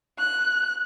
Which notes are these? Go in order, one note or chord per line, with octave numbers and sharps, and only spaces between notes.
F#6